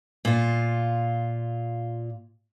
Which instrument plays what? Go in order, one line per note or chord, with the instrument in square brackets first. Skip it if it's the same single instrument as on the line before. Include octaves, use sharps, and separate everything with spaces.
[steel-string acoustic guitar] A#2 F4